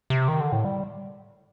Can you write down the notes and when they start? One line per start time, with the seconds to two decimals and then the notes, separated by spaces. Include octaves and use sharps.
0.10 C3
0.28 D#3
0.40 D3
0.52 A2
0.65 G3